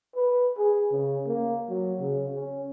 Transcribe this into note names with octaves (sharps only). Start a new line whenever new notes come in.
B4
G#4
C#3
A#3
F#3
C#3
C#4